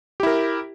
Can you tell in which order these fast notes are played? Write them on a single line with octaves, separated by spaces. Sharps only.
G4 E4 A#4